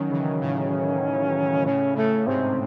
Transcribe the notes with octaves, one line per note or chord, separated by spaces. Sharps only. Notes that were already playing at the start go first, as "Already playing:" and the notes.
Already playing: D#3 F#3 C#4
C#3 E3
A2 C#3
A2 C#3 C#4
A2 C#3 A3
G#2 C3 C4